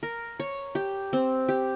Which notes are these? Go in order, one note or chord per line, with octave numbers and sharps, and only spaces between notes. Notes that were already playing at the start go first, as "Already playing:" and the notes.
A#4
C#5
G4
C4
G4